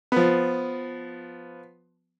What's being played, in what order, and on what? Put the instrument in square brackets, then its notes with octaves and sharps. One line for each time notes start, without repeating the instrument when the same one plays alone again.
[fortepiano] F3 B3